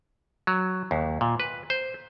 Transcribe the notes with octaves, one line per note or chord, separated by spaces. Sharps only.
F#3
D#2
A#2
B4
C5